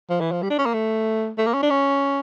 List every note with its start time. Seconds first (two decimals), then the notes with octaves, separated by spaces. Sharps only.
0.10 F3
0.21 E3
0.32 F3
0.43 G3
0.50 D4
0.59 C#4
0.66 A#3
0.74 A3
1.38 A3
1.46 A#3
1.54 C#4
1.63 D4
1.70 C#4